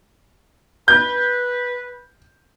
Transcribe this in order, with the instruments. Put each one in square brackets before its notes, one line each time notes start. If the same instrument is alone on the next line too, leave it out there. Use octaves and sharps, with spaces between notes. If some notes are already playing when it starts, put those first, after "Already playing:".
[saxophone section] B4 [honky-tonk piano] G6